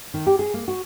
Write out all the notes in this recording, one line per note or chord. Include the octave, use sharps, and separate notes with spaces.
D#3
G4
G#4
A#3
F#4